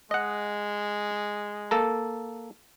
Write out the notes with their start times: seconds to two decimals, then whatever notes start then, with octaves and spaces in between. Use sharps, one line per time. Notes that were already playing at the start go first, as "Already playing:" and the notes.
0.11 G#3 D#5 F#5
1.71 A#3 A4 A#5